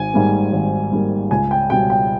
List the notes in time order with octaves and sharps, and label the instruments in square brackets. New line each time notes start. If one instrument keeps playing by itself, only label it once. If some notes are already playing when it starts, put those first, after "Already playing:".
Already playing: [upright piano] G#1 G#5
G#2 G3 A#3
G#1
G#2 G3 A#3
C#2 G#5
G5
B2 G3 G5
G5